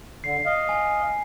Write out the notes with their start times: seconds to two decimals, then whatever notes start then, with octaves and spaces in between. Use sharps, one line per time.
0.24 D3 C7
0.45 D#5 F5
0.69 G#5